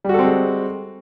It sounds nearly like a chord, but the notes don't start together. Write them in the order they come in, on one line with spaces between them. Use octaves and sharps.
G3 F#4 A4 C4 G#3